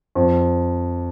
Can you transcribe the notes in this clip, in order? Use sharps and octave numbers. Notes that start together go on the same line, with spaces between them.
F2